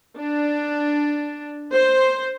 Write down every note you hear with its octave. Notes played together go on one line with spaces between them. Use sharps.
D4
C5